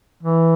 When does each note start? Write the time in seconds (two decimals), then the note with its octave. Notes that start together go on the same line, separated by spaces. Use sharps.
0.23 E3